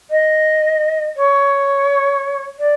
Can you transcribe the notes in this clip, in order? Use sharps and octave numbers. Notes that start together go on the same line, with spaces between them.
D#5
C#5
D5